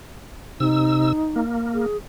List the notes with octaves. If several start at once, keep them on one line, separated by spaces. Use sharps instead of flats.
C3 D#4 E6
A#3
G#4